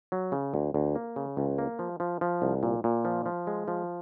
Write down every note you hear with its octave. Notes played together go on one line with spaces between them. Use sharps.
F#3
C#3
D2
D2
A#3
C#3
C#2
A#3
F3
F3
F3
C2
A#2
A#2
F3
F3
G#3
F3